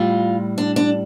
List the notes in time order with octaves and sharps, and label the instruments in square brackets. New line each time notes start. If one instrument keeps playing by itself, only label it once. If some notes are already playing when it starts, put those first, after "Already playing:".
Already playing: [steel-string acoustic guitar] A2 G3 F4
D4
D4